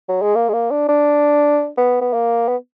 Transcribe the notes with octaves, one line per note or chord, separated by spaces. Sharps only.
F#3
G#3
A#3
G#3
A#3
D4
D4
B3
B3
A#3
B3